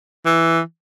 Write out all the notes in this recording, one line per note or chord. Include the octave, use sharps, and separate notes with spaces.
E3